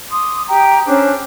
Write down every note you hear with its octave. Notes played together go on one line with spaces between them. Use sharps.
C6 D6 D#6
G4 G5 A#5
C#4 D4 G#4 C5